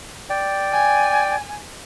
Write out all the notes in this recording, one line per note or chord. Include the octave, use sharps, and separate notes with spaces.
D5 G5
G#5